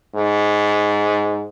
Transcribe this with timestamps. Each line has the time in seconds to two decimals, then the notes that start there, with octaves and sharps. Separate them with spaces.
0.15 G#2